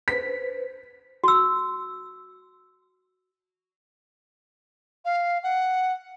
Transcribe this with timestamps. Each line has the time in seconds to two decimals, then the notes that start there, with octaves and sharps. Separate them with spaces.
0.08 B4 C5 B6
1.24 F#4 E6
5.05 F5
5.43 F#5